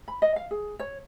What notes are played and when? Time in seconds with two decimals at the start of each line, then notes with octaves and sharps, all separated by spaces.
0.08 B5
0.22 D#5
0.36 F5
0.51 G#4
0.79 C#5